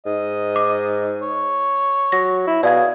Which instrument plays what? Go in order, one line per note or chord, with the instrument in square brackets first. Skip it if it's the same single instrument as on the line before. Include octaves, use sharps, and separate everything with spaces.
[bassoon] G#2 [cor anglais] D#5
[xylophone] D6
[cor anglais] C#5
[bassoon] F#3 [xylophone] A#6
[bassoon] E4
[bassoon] B2 [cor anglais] G#4 [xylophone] D5 F5 G#6